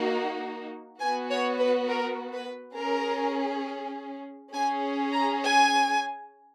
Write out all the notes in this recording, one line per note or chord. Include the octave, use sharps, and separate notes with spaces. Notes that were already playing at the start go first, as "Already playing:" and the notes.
Already playing: A#3 D#4 F#4
B3 F#4 G#5
C#5
B4
A#4
B4
C#4 G#4 A#4
C#4 G#4 G#5
A#5
G#5